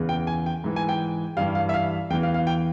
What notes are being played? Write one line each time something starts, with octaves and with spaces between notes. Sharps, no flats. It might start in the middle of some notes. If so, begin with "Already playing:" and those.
Already playing: E2 C#3 E3
G5
G#5
G5
G#2 E3
G#5
G5
G2 E3 F5
F5
E5
F5
E2 E3 G5
F5
F5
G5